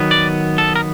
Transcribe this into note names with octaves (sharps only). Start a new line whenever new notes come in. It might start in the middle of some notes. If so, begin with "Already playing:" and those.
Already playing: D#3 F#3 B3
D5
A4
A#4